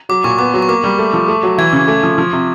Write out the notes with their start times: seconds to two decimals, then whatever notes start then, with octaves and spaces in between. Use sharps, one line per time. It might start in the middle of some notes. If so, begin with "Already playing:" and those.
0.09 F#3 D6
0.24 A#2 C#6
0.39 B3 D6
0.54 F#3
0.62 C#6
0.68 A#3 D6
0.84 G3
0.99 A3
1.14 F3
1.28 A3
1.43 F#3
1.58 E3 G#6
1.73 C#3
1.88 A3
2.03 F3
2.18 F3
2.33 C3